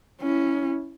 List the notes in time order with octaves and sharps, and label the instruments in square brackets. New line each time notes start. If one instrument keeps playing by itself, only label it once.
[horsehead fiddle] C#4 E4